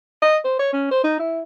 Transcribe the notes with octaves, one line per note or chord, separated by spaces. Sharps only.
D#5
C5
C#5
C#4
C5
D#4
E4